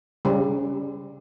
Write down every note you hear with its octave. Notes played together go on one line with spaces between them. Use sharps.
C#3 G3